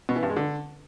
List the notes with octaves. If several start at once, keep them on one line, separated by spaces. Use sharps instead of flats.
B2
E3
G2
G#3
D3